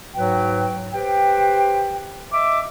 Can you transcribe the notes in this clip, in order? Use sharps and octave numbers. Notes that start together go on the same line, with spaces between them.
G#2 F#3 F#4 B4 G5
G4 B4 C5 G5
D#5 E5 D6